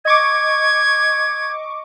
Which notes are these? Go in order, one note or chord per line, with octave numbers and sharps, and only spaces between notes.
D#5 C#6 D6 G#6